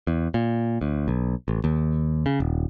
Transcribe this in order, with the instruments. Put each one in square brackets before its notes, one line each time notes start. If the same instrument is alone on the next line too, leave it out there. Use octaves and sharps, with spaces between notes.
[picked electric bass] E2
A#2
D2
B1
A1
D#2
C#3
D#1